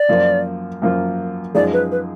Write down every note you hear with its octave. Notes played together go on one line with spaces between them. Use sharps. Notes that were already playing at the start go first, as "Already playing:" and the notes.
Already playing: D5
F#2 F3 A#3 F4
F#2 F3 A#3 F4
F#2 F3 G#3 D#4 G#4 D5
B4
B4